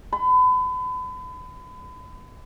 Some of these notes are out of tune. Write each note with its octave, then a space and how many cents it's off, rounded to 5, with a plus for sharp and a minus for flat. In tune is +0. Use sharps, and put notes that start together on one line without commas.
B5 +35